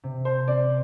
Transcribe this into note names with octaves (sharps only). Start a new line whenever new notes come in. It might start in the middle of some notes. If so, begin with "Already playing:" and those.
C3
C5
C4 D5